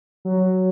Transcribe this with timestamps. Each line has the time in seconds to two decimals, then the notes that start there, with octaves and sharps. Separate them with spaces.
0.25 F#3